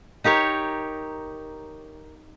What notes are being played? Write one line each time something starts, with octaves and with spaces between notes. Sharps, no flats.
D#4 G4 A#4 C#5